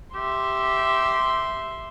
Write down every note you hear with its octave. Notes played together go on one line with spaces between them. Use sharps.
G4 E5 C6